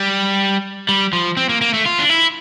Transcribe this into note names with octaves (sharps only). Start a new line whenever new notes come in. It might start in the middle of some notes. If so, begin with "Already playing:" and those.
Already playing: G3
G3
F3
C4
A#3
A#3
A3
F4
D4
E4